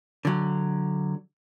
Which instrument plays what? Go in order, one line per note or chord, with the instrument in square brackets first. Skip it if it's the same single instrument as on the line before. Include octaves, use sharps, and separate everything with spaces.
[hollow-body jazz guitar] D3 F#3